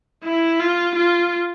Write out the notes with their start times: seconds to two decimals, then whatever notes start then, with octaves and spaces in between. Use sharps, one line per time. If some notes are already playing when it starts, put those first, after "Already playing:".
0.24 E4
0.60 F4
0.96 F4